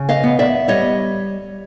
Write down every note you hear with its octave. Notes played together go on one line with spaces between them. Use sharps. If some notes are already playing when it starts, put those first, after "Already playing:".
Already playing: C#3
D#5 F5
B3
D5 E5
G3 C#5 D#5